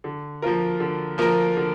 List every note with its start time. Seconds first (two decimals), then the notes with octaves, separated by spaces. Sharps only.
0.04 D3
0.42 F3 A#3 F4 A#4
0.80 D3
1.18 F3 A#3 F4 A#4
1.57 D3